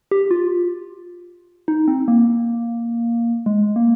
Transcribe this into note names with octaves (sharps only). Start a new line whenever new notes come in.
G4
F4
D#4
C4
A#3
G#3
A#3